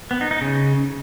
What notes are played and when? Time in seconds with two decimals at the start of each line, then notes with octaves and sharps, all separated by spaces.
0.11 B3
0.21 D#4
0.31 D#4
0.41 C#3